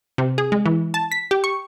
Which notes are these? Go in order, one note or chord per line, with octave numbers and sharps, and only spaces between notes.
C3
G#4
G#3
E3
A5
B6
G4
C#6